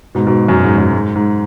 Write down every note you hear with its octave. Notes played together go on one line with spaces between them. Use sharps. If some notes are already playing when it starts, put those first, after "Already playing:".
G#2 B2
G#2 B2
F#2
G#2
F#2
G#2
G#2